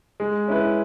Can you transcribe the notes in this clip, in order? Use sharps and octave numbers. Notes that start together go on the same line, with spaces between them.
G#3
C#4 E4 B4